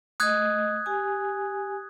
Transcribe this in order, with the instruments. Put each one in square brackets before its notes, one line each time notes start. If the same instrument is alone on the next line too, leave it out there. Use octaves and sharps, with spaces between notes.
[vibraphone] A3 D#5 [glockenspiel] D#6 F#6 G#6
[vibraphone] G4 G#5